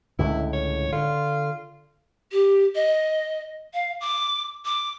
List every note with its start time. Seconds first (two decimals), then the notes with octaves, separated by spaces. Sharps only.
0.19 C#2 A2 D3 E4
0.53 C#5
0.92 D3 F4
2.32 G4
2.75 D#5
3.74 F5
4.01 D6
4.65 D6